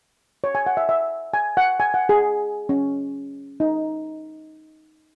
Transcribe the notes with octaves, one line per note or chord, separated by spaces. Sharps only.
C#5
G#5
F#5
E5
E5
G#5
F#5
G#5
F#5
G#4
C#4
D#4